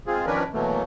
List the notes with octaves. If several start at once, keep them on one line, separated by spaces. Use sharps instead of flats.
G#3 C4 F4 G#4
D#3 F3 C#4 D4 A#4 B4
B2 E3 F#3 A3 A#3